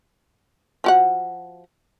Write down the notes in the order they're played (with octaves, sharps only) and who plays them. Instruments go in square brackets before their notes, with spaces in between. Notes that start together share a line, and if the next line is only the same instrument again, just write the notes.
[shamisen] F3 F#4 F#5